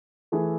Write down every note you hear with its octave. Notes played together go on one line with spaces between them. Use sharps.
E3 A3 E4 G#4